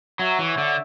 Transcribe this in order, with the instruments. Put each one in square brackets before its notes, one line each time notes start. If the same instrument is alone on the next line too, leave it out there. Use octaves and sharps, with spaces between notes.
[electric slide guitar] F#3 [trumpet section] F#4 C#5 E5
[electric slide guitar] E3
D3